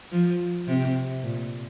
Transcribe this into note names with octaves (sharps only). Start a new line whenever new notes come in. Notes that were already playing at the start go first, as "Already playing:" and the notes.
F3
C3
A#2